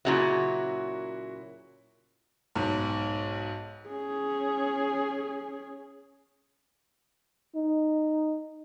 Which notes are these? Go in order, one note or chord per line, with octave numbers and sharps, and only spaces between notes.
A#2 C#3 F#3 E4 F#4 E5
B1 G#2
C#4 G#4
D#4